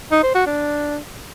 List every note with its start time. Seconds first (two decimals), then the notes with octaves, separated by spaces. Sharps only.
0.11 D#4
0.23 C5
0.35 F#4
0.46 D4